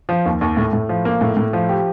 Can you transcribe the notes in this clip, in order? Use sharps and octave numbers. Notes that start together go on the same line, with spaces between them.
F3
D#2
D#2
A2
A2
F3
A#3
A2
A2
F3
G4